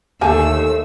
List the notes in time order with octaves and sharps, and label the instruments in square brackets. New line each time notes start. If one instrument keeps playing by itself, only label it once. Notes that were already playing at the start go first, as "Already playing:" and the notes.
[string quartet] D#2 E6 [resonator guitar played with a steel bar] D3 A3 [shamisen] G4 G#5 A5